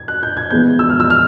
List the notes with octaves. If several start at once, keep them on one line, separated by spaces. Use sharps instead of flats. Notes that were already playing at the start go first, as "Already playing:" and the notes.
Already playing: G#6
F#6
G6
G#6
E3 G#3 B3 G6
E6
F6
E6
F6